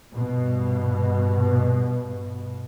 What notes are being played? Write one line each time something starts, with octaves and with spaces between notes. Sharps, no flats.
G2 B2